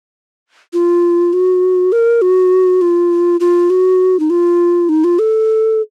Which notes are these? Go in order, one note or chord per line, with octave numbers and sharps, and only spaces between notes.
F4
F#4
A#4
F#4
F4
F4
F#4
D#4
F4
D#4
F4
A4